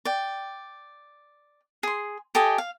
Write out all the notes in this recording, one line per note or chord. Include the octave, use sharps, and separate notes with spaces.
D5 G5
G#4 C6
G4 A4 D#5 G#5
F5